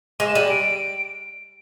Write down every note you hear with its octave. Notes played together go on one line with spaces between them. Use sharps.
G#3 D#7
E7
G3 D#7
D7